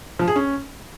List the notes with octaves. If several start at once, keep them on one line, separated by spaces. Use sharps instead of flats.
F3
G#4
C#4